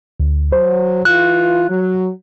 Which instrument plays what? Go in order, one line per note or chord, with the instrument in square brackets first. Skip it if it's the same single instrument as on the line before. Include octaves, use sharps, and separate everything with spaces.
[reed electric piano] D2
[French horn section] F#3 [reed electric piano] C5
[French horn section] E3 F4 [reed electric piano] F#6
[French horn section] F#3